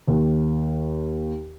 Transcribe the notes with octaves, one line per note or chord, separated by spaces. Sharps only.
D#2